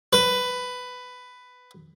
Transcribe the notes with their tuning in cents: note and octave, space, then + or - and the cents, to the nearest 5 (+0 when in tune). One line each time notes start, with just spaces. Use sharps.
B4 +10